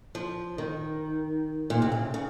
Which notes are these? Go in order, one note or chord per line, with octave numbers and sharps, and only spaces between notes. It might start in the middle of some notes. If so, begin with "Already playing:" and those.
F3
D#3
A#2
C3
C#3
C#3